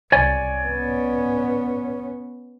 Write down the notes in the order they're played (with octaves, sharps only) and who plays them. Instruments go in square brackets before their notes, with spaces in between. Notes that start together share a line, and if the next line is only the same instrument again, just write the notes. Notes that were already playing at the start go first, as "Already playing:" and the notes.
[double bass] C2 [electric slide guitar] C#5 D5 G#5
[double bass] B3 C#4